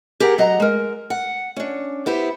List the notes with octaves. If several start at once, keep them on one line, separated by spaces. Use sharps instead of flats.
G4 G#4 A#4 F#5
F#3 D#5 F#5 A#5
G#3 A#4
F#5
C#4 D4
B3 E4 G4 C5